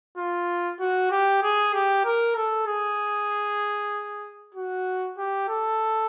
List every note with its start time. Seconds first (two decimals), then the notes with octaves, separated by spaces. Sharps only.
0.18 F4
0.80 F#4
1.11 G4
1.43 G#4
1.74 G4
2.05 A#4
2.36 A4
2.67 G#4
4.55 F#4
5.18 G4
5.49 A4